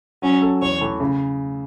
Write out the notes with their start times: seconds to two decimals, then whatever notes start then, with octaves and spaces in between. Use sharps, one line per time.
0.22 F#3 C#4
0.42 C#4 A4
0.62 E2 C#5
0.81 E3 A3
1.00 C#3